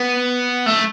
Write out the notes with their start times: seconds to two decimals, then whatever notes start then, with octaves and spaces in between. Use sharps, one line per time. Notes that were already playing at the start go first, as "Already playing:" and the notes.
Already playing: B3
0.66 A3